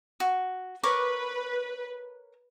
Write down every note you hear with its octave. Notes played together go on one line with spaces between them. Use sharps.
F#4
A#4 B4 C#5 D6